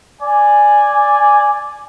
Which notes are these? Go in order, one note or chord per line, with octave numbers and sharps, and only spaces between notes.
D5 G#5